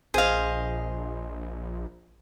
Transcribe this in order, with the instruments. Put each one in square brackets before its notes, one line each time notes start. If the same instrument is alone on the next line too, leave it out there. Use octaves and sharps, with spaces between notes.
[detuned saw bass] A#1 [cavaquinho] G#4 F5 [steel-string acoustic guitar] C5 D#5